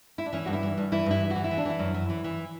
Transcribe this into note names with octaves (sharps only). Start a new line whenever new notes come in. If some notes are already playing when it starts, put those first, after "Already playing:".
E4
D4
E3 C#4
G2 F#4
E4
E3
G2
E3 E4
G2 E4
E3
F#4
E3
E4
E3
D4
E3 E4
F#2
E3
E3
E3